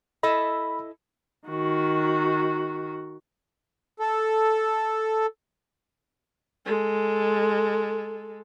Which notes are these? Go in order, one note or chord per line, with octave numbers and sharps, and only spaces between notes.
E4 A4 D#5 B5
D#3 F#4
A4
G#3 A4